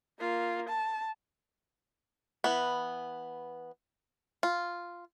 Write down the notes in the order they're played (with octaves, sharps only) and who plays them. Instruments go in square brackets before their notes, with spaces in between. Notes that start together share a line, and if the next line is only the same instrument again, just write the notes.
[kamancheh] A#3 F4
A5
[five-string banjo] E3 B3
F4